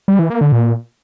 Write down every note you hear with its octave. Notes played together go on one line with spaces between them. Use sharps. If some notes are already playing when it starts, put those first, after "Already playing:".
G3
E3
A#3
D3
A#2